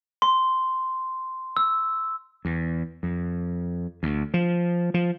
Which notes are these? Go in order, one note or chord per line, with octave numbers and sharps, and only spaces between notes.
C6
E6
E2
F2
D2
F3
F3